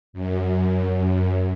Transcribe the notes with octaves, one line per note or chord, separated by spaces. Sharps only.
F#2
F#2